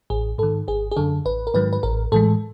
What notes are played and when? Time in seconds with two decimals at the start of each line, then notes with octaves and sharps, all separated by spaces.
0.10 A1 G#4
0.38 G#2 D#3 A4
0.68 G#1 G#4
0.91 G#4
0.97 F#2 D3 A4
1.25 A1 B4
1.47 A#4
1.54 G#2 D#3 F#3 B4
1.73 B4
1.83 A1 A#4
2.12 A2 E3 G#3 A4